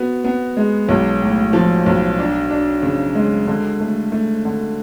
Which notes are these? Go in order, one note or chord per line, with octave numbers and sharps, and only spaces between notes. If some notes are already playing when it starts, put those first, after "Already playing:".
Already playing: B3 F#4
B3
G#3
B1
A2
F3
B1
D4
D4
C#3
G#3
D3
A3
A3
D3